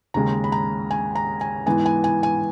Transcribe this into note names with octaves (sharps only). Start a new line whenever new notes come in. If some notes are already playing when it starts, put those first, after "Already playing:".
D#2 C#3 G#3 A#5
B5
A#5
G#5
A#5
G#5
G#2 E3 B3 G#5
G#5
G#5
G#5